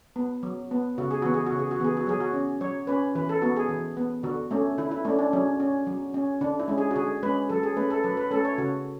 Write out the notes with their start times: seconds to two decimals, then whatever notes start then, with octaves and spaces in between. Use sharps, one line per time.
0.16 B3
0.43 F#3
0.71 B3
0.98 C#3 F#4
1.11 G#4
1.22 E3 B3 F#4
1.34 G#4
1.46 F#4
1.52 C#3
1.59 G#4
1.71 F#4
1.80 E3 B3 G#4
1.97 F#4
2.07 F#3 G#4
2.20 F#4
2.33 C#4
2.61 F#3 C#5
2.87 C#4 B4
3.15 E3 B4
3.29 A4
3.42 B3 F#4
3.56 G#4
3.69 E3
3.97 B3
4.23 D3 F#4
4.51 A3 C#4
4.78 D3 E4
4.91 E4
5.05 A3 D4
5.09 C#4
5.19 D4
5.33 F#3 C#4
5.60 C#4
5.87 F#3
6.14 C#4
6.41 D3 D4
6.60 E4
6.68 G#3 C#4
6.78 G#4
6.91 F#4
6.96 D3 G#4
7.23 G#3 C#4 B4
7.49 F#3 A4
7.63 G#4
7.76 A3 C#4 B4
7.90 A4
8.04 F#3 B4
8.17 B4
8.31 A3 C#4 A4
8.45 C#5
8.58 C#3 F#4